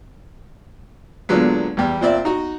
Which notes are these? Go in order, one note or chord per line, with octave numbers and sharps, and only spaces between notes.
A#2 D3 F#3 G#3 B3
E2 G3
A#2 C4 D5 E5
D#4 F#4